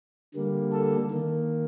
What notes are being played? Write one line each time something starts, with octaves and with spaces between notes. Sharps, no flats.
D3 G3 A#3
A4
D#3 A#3